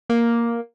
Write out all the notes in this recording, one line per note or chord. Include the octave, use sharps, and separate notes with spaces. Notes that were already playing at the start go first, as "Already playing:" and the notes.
A#3